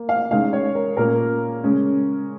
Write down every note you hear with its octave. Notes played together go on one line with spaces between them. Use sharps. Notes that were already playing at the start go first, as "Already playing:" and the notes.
Already playing: A#3
F5
D#3 G#3 C#4 F5
C#5
A#4
A#2 A#3 C#4 A#4
C#3 G#3 C#4